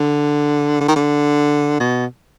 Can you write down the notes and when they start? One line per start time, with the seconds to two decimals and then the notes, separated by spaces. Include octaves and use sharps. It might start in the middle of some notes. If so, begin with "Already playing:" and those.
Already playing: D3
0.81 D3
0.88 D#3
0.96 D3
1.80 B2